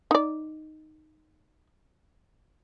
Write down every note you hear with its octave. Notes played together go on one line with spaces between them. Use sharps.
D#4 D5